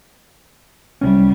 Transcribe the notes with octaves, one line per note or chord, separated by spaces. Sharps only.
C2 G3 C#4